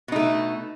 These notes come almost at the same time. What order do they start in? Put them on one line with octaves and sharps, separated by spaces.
B2 D#4 A3